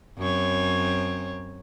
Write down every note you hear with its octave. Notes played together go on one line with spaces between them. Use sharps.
F#2 C4 C#5